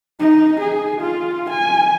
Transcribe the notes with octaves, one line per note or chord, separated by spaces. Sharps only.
D#4
G#4
F4
G#5